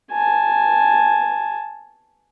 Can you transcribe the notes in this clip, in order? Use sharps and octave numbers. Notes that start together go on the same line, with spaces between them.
G#5 A5